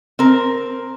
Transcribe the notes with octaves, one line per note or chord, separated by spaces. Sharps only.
C4 A#4